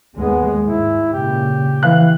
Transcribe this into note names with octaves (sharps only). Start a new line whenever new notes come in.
D#2 G#3 B3
G#2 E4
A#2 C#3 G4
E3 F5 F#6